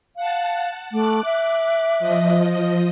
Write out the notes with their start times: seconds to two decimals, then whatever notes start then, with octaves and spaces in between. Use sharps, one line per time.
0.17 F5 F#5 A5
0.92 A3 D6 F#6
1.25 E5
2.00 F3 D#5